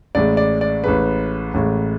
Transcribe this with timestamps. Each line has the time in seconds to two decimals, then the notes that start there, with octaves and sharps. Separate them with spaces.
0.15 A1 A2 G#3 D5
0.37 D5
0.61 D5
0.84 A1 A2 G#3 B4
1.54 A1 A2 G#3